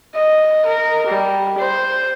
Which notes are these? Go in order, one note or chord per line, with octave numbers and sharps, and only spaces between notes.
D#5
A#4
G3
C5